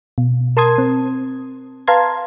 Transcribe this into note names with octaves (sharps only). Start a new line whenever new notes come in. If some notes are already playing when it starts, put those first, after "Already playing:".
B2
A#4 A5 C6 D#6 G#6
C4
B4 F5 A5 A#5 C6 G#6